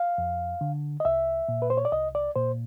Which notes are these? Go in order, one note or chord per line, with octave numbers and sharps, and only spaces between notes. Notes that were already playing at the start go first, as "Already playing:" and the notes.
Already playing: F5
F2
D3
D#5
C2 E5
A#2
B4
C5
C#5
D5
C2 D#5
D5
A#2 C5